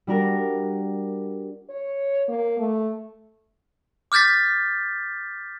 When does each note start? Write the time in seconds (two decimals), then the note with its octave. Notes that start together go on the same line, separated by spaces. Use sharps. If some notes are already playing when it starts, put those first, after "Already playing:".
0.07 G3 D4 F#4 A#4
1.70 C#5
2.28 A#3
2.59 A3
4.12 D6 F6 G6 A6 B6